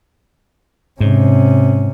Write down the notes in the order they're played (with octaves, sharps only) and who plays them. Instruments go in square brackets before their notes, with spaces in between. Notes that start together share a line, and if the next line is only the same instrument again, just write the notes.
[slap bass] G#2 [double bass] C3 C#4